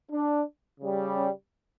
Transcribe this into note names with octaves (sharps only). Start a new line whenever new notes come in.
D4
C#3 G3
C#4